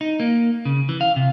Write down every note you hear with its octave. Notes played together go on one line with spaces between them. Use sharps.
D#4
A#3
C#3
E3
F5
C3